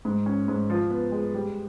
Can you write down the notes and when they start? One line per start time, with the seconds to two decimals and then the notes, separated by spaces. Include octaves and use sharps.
0.05 G#2
0.26 C#4
0.48 G#2
0.70 F3
0.90 B3
1.12 G#3
1.34 G3